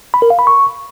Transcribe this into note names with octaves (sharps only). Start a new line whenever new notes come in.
B5
A#4
F5
B5
C#6